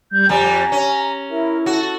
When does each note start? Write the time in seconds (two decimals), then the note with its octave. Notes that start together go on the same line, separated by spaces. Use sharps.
0.11 G3 G6
0.29 F2 G3 G#5 A#5
0.72 C#4
1.30 E4 A#4
1.66 F#4 A4